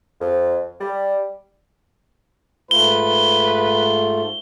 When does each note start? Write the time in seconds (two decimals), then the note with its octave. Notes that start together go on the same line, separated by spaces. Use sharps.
0.21 F2
0.80 G3
2.71 G#2 A3 F4 B4 G7